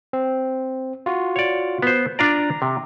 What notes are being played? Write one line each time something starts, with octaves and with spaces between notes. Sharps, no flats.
C4
F4 F#4
C#5 D5
B3 C5
D4 F4 D5 A#5
C3